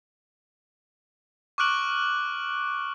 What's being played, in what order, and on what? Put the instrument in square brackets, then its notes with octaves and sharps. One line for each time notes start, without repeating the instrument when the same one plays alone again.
[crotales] C#6 D6 F6 F#6 D7 F#7